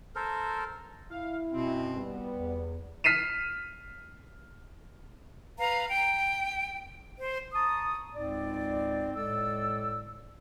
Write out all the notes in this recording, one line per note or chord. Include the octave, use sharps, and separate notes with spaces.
A4 A#4 C5
E4 F5
F#2 B2 C4
G3 B3
E2
F6 B6 C7 D#7 E7
B4 F5 A#5
G5
C5
A5 A#5 C#6 D#6
C#2 G#2 C4 D5
A2 G#3 A4 D5 E6